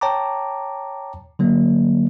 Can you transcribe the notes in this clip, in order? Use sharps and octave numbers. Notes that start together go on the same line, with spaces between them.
C#5 G5 A5 A#5 D6
D3 F#3 A#3